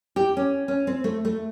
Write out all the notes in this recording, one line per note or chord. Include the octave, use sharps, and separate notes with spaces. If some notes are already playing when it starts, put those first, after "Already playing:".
G4
C#4
C#4
C4
A3
A3